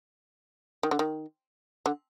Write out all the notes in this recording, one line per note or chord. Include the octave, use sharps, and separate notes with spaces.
D#3
D3
D#3
D3